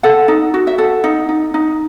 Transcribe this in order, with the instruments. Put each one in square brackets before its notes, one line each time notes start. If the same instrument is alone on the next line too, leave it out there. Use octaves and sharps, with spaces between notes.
[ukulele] A4 F#5
D#4
F#4
E5
A4 F#5
D#4
D#4
D#4